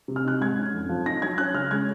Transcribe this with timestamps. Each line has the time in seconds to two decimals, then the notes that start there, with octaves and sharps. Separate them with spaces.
0.08 C3
0.16 F6
0.24 D#4 F#6
0.41 G#2 G#6
0.58 C#4
0.74 F2
0.89 F3
1.06 D#4 A#6
1.22 F#3 G#6
1.38 C#4 F#6
1.54 C#3 F6
1.71 G#3 G#6